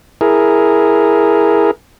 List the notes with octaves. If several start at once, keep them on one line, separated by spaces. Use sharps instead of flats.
E4 G#4 A#4